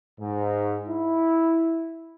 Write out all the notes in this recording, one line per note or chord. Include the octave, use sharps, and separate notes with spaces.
G#2
E4